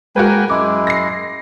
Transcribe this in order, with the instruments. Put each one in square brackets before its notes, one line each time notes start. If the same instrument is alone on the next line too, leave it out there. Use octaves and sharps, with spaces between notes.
[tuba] G#3 [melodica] A#3 G5 G#5 [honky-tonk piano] F#4 A#4 B4
[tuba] F#2 [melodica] G#3 E4 [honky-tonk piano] D6
[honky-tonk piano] A#6 C7